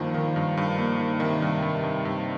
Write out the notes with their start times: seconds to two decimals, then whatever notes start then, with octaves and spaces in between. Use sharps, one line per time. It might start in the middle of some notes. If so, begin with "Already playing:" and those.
Already playing: G2 D#3 F3 A#3
0.14 D#3
0.36 G2
0.57 G2
0.78 A#3
1.00 D#3
1.20 C3 D#3
1.42 G2
1.62 G2
1.83 G2
2.05 G2